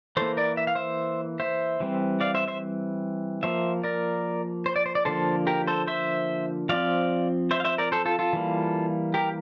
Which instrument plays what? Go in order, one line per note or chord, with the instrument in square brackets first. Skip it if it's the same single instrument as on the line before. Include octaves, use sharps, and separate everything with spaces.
[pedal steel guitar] E3 A#3 A4 C5
A#4 D5
E5
F5
C5 E5
C5 E5
E3 G3 C4
D5 F5
C5 E5
C5 E5
F3 A#3 C5 E5
A#4 D5
C5
D5
C5
D5
D3 F3 A#3 A4 C5
G4 A#4
A4 C5
C5 E5
F3 C4 D5 F5
C5 E5
F5
C5 E5
A#4 D5
A4 C5
F4 A4
F4 A4
E3 G3 A#3
G4 A#4